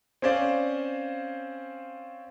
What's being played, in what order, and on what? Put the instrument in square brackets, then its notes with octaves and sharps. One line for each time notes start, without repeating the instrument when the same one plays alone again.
[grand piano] C4 C#4 C5 D5 F5